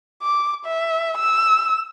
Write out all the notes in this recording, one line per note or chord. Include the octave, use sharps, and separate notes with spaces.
D6
E5
E6